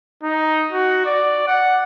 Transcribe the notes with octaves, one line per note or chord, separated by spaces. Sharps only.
D#4
F#4
D5
F#5